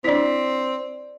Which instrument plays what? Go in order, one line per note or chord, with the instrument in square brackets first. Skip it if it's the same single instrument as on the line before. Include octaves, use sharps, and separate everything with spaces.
[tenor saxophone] C4 [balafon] D4 E4 [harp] D5 B6